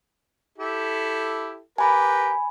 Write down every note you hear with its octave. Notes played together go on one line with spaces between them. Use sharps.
E4 G4 A4
G4 A#4 B4 G#5 B5